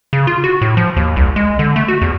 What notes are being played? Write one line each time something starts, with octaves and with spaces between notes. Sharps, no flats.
C#3
F4
F#4
A2
F3
D#2
C2
G#3
D3
A3
F#4
E2